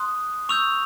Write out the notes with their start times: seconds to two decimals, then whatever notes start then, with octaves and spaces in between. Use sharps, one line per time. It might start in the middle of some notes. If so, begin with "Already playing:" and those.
Already playing: C6 D#6 F#6
0.49 C#6 E6 G6 F7